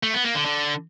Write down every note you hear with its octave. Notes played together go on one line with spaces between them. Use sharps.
A3
B3
A#3
D3
D3